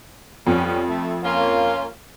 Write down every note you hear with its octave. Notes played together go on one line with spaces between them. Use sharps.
F2 G3 B3 C#4
A3
A#3 C#4 F4